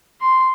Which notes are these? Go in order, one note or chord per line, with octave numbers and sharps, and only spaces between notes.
C6